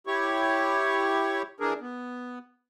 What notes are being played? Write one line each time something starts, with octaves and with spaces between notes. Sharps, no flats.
E4 G4 C#5 C#6
E3 D4 G#4 A#4
B3